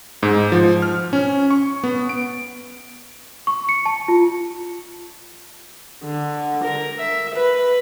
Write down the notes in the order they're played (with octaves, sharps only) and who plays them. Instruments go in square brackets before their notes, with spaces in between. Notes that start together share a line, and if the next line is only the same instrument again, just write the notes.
[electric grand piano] G#2
F3
F6
C#4
C#6
B3
D7
[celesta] C#6
C#7
A5
F4
[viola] D3
A#4
E5
B4